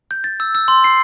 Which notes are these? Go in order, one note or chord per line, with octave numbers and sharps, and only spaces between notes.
G6
A6
E6
E6
C6
C7